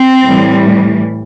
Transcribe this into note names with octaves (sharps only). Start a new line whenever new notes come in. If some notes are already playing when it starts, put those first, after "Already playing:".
Already playing: C4
A2 E3 G3